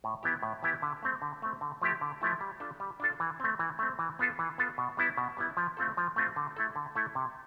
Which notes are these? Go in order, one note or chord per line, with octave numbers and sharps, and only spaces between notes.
A2
E3 B3 E4 G4
A2
E3 B3 E4 G4
D3
A3 C4
D3
A3 C4
D3
F3 A3 E4 G4
D3
F3 A3 E4 G4
G3
D4 F4 A4
G3
D4 F4 A4
E3
A3 C4
E3
A3 C4
E3
B3 F4 A4
E3
B3 F4 A4
B2
G3 B3 E4
B2
G3 B3 E4
F3
A3 C4 F4 A4
F3
A3 C4 F4 A4
D3
A3 E4 A4
D3
A3 E4 A4
C3